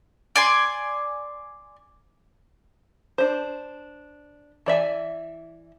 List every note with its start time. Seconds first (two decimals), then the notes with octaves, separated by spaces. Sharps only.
0.36 D5 G#5 C6
3.18 D4 C5
4.66 E3 D5 E5 G#5